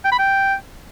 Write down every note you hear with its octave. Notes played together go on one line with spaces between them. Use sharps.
G5
B5
G5